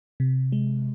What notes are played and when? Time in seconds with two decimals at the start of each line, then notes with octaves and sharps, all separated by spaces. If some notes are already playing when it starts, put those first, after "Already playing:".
0.20 C3
0.52 G#3